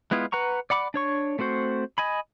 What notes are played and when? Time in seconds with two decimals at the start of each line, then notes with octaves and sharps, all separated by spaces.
0.11 G#3 B3 E4 F4
0.32 B4 F#5 A#5 C#6
0.70 D5 F#5 B5 D6
0.94 D4 C#5 C#6
1.39 A3 C4 F#4 C5
1.98 D#5 G#5 B5